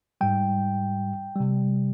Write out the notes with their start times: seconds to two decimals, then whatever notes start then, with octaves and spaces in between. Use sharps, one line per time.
0.21 G#2 G3 G5
1.35 C3 G3